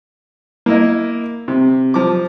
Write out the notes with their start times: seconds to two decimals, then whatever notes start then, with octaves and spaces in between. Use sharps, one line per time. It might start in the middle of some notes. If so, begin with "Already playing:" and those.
0.66 A#3 E4 D#5
1.48 C3
1.94 F3 D6